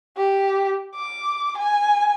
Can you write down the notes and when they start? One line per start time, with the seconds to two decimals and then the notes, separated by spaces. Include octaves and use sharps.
0.17 G4
0.95 D6
1.58 G#5